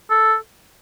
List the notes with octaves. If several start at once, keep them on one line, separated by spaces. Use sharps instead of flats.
A4